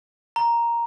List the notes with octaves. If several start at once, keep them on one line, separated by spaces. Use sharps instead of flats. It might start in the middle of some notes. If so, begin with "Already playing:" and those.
A#5